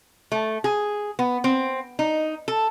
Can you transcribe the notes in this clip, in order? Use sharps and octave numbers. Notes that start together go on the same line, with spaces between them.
A3
G#4
B3
C4
D#4
A4